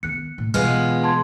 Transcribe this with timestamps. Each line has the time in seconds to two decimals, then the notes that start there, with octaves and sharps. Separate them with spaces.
0.03 D#3 B3 F#6 C#7
0.38 A2
0.54 B2 E3 G#3 B3 F4 F6
1.03 A5 C6 G#6